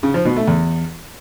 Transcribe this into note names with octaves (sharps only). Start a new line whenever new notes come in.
C#3
F3
B2
A3
E2